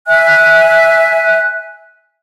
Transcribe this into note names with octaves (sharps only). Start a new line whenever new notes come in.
E5 G#5 F#6